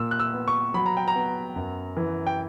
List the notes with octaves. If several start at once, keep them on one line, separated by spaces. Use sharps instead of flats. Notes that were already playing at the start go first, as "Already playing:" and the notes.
Already playing: A#2 E6
F#6
E6
B3
C#6
F#3 B5
A#5
G5
A#5
B3
F#2
E3
G5